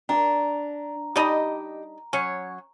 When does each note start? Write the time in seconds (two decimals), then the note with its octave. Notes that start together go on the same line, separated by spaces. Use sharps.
0.09 D4 A#5
1.16 G3 D4 D#4 G4 D#5
2.13 F#3 C#4 C#5